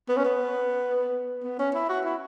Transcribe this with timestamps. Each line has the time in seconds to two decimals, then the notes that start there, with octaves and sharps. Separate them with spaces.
0.09 B3
0.17 C#4
0.25 B3
1.43 B3
1.59 C#4
1.74 E4
1.89 F#4
2.05 E4